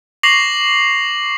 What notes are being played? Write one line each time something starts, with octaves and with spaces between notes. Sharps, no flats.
C#6 D6 A#6 C7 F7 F#7